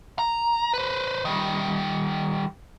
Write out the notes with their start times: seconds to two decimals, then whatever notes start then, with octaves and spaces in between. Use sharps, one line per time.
0.19 A#5
0.73 B4 C5
1.25 D#3 G3